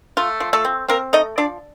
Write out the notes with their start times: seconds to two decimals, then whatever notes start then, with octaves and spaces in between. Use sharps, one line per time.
0.17 A3 F4
0.40 F3
0.53 A3 A4
0.65 C4
0.88 A#3 C4 A#4
1.13 A3 D#4 D#5
1.38 F3 D4 D5